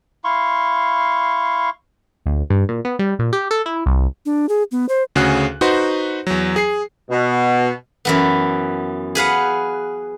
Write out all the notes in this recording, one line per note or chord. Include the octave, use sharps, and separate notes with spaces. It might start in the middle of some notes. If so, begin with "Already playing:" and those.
E4 F5 C6 C#6
D2
G2
A#2
B3
G3
A#2
G4
A4
E4
C2
D4
G#4
B3
C5
D2 C#3 C#4 F#4 G#4 F#6
D#4 F#4 B4 C5 F#5 C6
E2 F#3
G#4 C7
B2
F#2 E3 B3
G#4 B4 F5 F#5